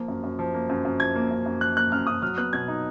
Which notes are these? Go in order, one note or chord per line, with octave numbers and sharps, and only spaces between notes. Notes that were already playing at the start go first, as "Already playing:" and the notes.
Already playing: F3 A#3
F#2
F#2
F3
A#3
F#2
F#2
F3 G#6
A#3
F#2
F#2
F3 F#6
A#3 F#6
F#2 F6
F#2 D#6
F#3 F6
B3 F#6
B2 G#6
D#4